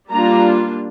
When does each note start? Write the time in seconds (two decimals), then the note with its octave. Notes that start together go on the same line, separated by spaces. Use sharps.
0.11 G3 A#3 D4 F4 A#5